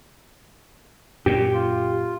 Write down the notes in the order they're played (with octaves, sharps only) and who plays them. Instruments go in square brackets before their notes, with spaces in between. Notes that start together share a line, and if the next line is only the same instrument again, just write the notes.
[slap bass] F#2 A#2 [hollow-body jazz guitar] G4
[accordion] F4